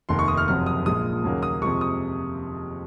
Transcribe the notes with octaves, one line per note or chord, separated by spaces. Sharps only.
F1 D#2 D#3 C6
C#6
D#6
F6
F#1 F2 C3 F#3 F6
D#6
A#1 A#2 G#3 D#6
D#2 C#3 F#3 A#3
D#6
F2 C3 F3 G#3 C#6
D#6